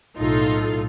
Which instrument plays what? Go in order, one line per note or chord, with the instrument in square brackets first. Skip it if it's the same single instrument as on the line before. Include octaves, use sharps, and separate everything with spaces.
[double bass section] B1 A2 [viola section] D#4 F4 A4